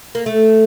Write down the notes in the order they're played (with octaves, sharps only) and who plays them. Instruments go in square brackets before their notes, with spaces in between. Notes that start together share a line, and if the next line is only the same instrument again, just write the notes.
[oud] A#3
A3